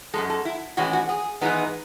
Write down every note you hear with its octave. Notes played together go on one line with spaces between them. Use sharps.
F#2 C#3 G#3 A4
A4
E4
A2 E3 G#3 C#4 F#4
F#4
G#4
G#2 E3 G#3 B3 D#4